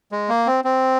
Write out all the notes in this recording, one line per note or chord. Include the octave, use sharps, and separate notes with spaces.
G#3
A#3
C4
C4